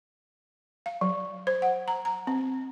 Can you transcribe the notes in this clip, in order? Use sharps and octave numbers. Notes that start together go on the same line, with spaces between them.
F5
F#3
C5
F#5
A#5
A#5
C4